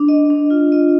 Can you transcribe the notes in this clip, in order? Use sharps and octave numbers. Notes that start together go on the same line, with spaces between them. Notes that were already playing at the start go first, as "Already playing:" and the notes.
Already playing: D4
D#5
D4
F4
D#5